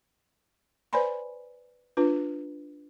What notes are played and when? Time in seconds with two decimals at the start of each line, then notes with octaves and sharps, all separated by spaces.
0.93 B4 C5 D5 G#5 B5 C6
1.97 D4 F4 B4